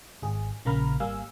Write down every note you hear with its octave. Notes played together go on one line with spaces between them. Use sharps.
G#1 G#4
A#1 C#3 A#3 A#5 B5 F6
G#1 G3 A#3 F5 G#5 E6